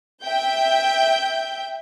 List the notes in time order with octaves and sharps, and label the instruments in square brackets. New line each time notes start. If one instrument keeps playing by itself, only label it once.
[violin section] E5 G5 G6